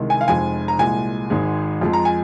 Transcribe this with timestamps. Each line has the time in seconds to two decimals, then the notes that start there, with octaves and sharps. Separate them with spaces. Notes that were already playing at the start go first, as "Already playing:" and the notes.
Already playing: C2 C3 D#3 G#3
0.10 G#5
0.21 F5
0.28 F1 F2 F3 G#3 G#5
0.68 A#5
0.78 C2 A#2 F3 G#3 G#5
1.30 G#1 G#2 G#3
1.81 F2 F3 G#3
1.93 A#5
2.05 G#5